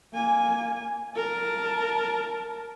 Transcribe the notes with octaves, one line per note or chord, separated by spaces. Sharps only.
A#3 G#5
A#4 A5